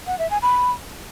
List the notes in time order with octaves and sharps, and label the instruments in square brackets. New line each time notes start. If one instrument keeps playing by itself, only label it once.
[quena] F#5
E5
G#5
B5